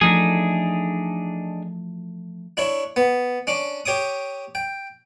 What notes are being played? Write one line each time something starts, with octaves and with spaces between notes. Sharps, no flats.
E3 F3 A3 D4 D#4 G#4
D4 E4 C#5
B3
C#4 D4 D6
G4 C#5 D6 D#6
G5